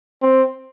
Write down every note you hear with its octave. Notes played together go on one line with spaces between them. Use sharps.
C4